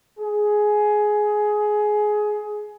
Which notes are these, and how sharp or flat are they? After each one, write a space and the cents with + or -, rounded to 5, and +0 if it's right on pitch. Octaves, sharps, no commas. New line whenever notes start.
G#4 +15